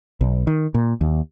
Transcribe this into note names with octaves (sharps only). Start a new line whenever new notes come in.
B1
D#3
A#2
D#2